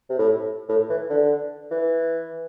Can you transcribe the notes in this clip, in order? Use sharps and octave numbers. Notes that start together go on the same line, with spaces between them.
C3
A2
A2
E3
D3
E3